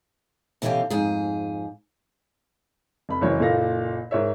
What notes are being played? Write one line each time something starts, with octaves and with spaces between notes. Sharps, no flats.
B2 D3 E3 C#4 G4 F5
F2 G#2 G#4
F1 B5
F#1 E3 F#3 C#5
F#1 A#2 A4 F5 A#6
G#2 A#4 C#5 E5